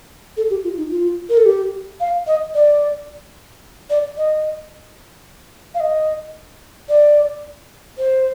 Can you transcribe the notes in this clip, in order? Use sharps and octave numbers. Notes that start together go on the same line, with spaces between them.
A4
G4
F4
D#4
F4
A#4
A4
G4
F5
D#5
D5
D5
D#5
F5
D#5
D5
C5